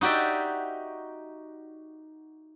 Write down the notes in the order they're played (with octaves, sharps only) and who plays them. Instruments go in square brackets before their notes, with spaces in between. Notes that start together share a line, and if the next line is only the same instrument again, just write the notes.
[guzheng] D#4 F#4 G4 D5 E5